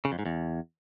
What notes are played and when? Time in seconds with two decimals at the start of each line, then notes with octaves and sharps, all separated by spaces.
0.05 C#3
0.12 F2
0.19 G#2
0.26 E2